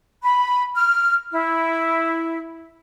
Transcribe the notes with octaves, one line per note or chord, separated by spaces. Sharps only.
B5
F6
E4